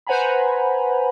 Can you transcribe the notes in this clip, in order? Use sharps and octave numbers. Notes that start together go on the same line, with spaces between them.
B4 C5 F#5 G#5 A#5 B5